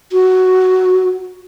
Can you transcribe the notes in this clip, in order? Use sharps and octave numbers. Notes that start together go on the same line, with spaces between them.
F#4